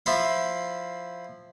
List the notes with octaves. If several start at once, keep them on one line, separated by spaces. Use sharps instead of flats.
F3 E4 F5